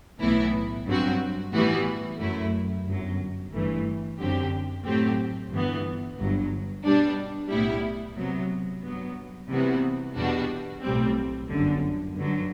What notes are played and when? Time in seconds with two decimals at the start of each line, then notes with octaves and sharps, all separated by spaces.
0.21 B1 A2 E3 B3 E4
0.87 G2 F#3 C4 F#4
1.53 A2 E3 G3 B3 F#4
2.20 F#2 F#3 A3 E4
2.86 G1 F#2 F#3
3.53 G1 G2 E3 A3
4.20 F#2 D3 F#3 C4 G4
4.86 A2 F#3 A3 C4 G4
5.52 G1 G2 E3 B3
6.19 G1 G2 F#3
6.85 B2 G3 D4
7.52 B1 A2 G3 B3 E4
8.18 C3 F#3 B3
8.84 G2 F#3 B3
9.51 C3 E3 G3 B3 F#4
10.17 E2 B2 G3 D4 F#4
10.84 B1 A2 G3 C4
11.51 G1 F#2 D3
12.17 G2 D3 F#3